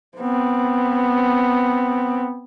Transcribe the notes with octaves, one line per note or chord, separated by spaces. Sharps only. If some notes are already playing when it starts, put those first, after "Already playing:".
B3 C4